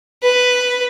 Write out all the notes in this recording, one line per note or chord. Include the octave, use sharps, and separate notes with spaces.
B4